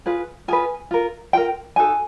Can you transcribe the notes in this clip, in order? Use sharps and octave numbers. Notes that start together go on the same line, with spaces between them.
F4 G#4 B4
F4 G#4 B4 G#5
F4 A#4
F4 A#4 G5
D#4 F#4 A4 G#5